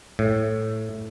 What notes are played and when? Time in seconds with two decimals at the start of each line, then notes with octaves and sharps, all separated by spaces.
0.19 A2